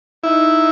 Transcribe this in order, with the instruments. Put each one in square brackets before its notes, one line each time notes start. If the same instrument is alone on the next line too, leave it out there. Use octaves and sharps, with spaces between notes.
[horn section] D#4 [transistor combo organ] E4